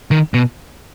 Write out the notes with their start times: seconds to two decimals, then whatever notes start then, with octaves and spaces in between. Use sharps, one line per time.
0.11 D#3
0.34 B2